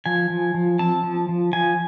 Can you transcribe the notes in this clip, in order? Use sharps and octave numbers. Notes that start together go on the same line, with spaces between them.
F3 G#5
F3
F3
C4 A5
F3
F3
F3 G#5